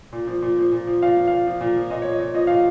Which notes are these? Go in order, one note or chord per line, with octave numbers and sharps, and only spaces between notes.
A#2
F3
A#2
F3
A#2
F3
A#2 F5
F3
A#2 F5
F3
A#2
F3
A#2 D#5
C#5
F3
D#5
A#2
F3 D#5
A#2 F5